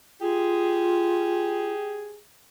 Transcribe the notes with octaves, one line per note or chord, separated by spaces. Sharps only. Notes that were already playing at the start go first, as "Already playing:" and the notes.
F4 G4 G#4